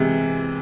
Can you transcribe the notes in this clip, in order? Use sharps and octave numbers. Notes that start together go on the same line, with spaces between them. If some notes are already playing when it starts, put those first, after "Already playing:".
Already playing: C3 E3 G#3